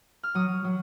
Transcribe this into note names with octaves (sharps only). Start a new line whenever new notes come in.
F6
F#3 D#6
F#3